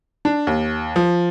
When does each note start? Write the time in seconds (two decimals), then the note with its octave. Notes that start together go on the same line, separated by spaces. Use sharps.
0.25 D4
0.47 D#2
0.96 F3